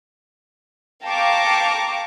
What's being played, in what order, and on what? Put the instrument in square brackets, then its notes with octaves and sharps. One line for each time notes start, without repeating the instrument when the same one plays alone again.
[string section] F5 G5 A5 A#5 C#6 D6